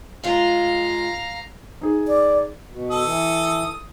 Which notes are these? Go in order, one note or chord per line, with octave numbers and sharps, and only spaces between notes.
G#3 F4 F5 A#5
D#4 G#4
D5
B2
A4 D#6
E3